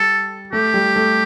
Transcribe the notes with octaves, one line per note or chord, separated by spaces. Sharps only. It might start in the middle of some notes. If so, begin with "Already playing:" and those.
Already playing: G3 A4
A3 G4
G3
A3